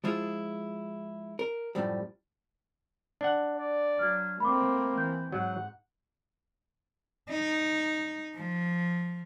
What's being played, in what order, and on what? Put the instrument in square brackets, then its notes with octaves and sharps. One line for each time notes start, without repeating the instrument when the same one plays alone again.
[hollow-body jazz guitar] F3 G#3 E4 F4 G#4
A#4
F#2 A2 F3 G3
[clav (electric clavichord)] D4 F#5
[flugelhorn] D5
[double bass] F#3 [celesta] F6 G#6
[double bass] A3 C4 [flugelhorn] A#3 [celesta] B5 D6
[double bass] E3 [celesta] G6
[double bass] G#2 [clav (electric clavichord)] F#3 [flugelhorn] F#5
[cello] D#4
F3